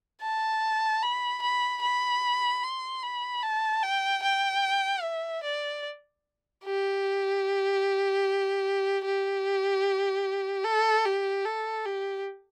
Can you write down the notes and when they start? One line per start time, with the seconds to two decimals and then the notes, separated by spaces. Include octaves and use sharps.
0.22 A5
1.03 B5
1.42 B5
1.82 B5
2.63 C6
3.03 B5
3.43 A5
3.83 G5
4.23 G5
5.03 E5
5.43 D5
6.64 G4
9.05 G4
10.65 A4
11.05 G4
11.45 A4
11.86 G4